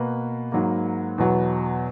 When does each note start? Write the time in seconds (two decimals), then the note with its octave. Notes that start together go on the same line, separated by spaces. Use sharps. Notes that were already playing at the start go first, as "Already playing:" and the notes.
Already playing: B2 A#3 B4
0.52 G#2 F#3 A#3
1.18 E2 B2 F#3 B3